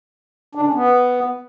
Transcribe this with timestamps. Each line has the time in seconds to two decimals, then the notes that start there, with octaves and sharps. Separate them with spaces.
0.55 D4
0.61 D3
0.68 C#4
0.74 B3